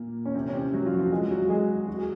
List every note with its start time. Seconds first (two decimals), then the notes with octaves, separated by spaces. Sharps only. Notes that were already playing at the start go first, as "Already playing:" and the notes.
Already playing: A#2 A#3
0.25 C#4
0.34 C3 C4
0.48 C#4
0.53 C3 C4
0.74 F#3
0.86 F3 F4
0.93 F#4
0.99 F3 F4
1.12 G#3 G#4
1.31 F#3 F#4
1.49 G#3 G#4
1.87 F#4
1.98 G#4